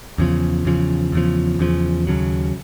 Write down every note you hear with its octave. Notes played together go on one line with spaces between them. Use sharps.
E2 C#3 F3
E2 C#3 F3
E2 C#3 F3
E2 C#3 F3
D#2 C#3 F#3